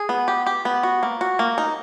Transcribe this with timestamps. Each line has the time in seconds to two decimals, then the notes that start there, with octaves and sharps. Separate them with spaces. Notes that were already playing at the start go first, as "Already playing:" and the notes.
Already playing: G#4
0.09 B3
0.28 G4
0.47 G4
0.65 B3
0.83 F#4
1.03 A#3
1.21 F#4
1.39 A#3
1.58 D#4